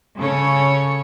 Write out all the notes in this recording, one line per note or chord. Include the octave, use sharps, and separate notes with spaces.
C#3 C#4 A4 C#5